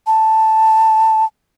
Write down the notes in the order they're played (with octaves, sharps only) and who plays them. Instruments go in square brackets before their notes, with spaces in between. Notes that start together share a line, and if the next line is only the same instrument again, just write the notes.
[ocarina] A5